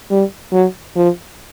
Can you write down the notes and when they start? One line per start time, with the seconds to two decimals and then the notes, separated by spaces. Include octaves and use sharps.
0.10 G3
0.52 F#3
0.96 F3